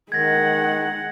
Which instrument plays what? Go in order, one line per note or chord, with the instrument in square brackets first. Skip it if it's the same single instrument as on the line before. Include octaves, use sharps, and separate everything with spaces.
[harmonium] D#3 [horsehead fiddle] G#3 F#5 [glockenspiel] G#6 A#6